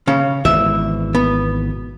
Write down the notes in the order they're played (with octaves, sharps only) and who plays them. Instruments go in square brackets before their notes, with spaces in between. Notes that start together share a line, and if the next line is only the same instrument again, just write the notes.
[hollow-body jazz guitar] C#3 C#4
[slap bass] G#1 B2 E3 [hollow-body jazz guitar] E5
[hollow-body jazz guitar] B3